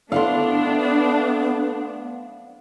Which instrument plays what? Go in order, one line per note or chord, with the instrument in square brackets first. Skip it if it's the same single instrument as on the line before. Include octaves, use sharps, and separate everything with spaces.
[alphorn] A3 [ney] B3 [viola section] D4 [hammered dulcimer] F5 F#5 C6